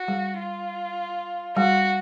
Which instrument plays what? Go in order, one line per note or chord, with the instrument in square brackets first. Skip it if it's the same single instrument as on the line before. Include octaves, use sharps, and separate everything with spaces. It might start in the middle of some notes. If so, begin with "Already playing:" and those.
Already playing: [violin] F#4
[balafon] G3
[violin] F4
[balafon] G3 [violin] F#4